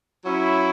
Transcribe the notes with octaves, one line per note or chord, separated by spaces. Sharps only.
F#3 C#4 E4